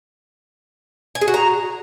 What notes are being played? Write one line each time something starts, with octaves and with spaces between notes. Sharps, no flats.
G#5
G#4
F#4
A#5